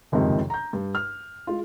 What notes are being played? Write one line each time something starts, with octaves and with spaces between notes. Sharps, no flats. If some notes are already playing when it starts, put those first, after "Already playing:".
F#1 F2 G#2 C3 D#3
A#5 G6
G2
F6
G#3 F4